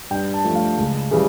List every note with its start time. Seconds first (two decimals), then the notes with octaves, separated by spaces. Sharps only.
0.11 G2 G5
0.34 A5
0.44 F3 A3
0.55 F5
0.78 C#2
1.11 C#3 E3 G3